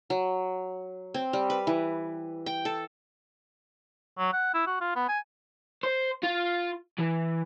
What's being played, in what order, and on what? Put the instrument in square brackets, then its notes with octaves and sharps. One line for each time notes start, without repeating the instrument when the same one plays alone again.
[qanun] F#3
C4
G3
B4
E3
G5
A4
[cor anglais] F#3
F#5
E4
F#4
F4
B3
G#5
[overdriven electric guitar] C5
F4
E3